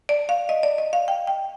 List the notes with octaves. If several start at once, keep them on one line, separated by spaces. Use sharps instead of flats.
D5
F5
D#5
D5
D#5
F5
G5
G5